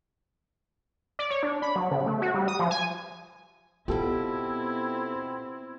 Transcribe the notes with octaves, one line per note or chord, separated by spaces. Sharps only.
D5
C#5
D4
B5
F#3
C#3
A3
F#4
G3
D#6
F3
G#5
B2 B3 C4 E4 F4 G4 A4